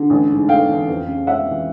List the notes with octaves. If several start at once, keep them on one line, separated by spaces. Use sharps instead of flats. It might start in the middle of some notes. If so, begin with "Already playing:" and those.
Already playing: D3
A1
G#2
A3 F5 G5
E3
F2
C#3
G#3 E5 F#5
E3